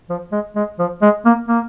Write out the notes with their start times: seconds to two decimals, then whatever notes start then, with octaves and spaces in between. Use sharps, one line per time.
0.10 F3
0.32 G#3
0.56 G#3
0.79 F3
1.02 G#3
1.26 A#3
1.49 A#3